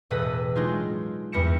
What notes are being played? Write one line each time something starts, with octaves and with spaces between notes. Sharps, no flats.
E1 A2 A4 B4 D#5 B6
F#3 G#3 D4 D#4 F4 G#4
E2 G2 G3 A#6 C#7 E7